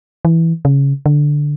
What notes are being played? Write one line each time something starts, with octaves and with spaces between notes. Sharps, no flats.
E3
C#3
D3